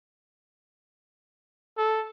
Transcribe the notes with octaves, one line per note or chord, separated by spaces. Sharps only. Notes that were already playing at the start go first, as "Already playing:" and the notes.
A4